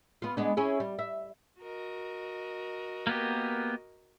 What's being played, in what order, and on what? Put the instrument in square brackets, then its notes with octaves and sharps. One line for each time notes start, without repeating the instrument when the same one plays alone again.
[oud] B3 F4
G#3 B3 D4
C#4 E4 G#4
G3
E5
[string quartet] F#4 A#4 D#5
[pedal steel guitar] A#3 B3 G4